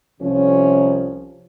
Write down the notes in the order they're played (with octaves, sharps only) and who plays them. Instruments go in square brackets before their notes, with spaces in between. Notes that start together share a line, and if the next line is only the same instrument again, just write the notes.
[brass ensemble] C2 C3 F3 C#4